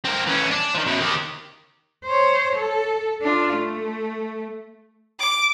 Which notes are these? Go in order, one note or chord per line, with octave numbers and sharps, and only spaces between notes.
C4 A#4
E3 C#4
D4
D#3 F3
F#2 B2
D#3 G4
C5 C#5
A4
D4 F4
A3
D6